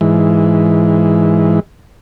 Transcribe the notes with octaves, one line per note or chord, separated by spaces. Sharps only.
G#2 E3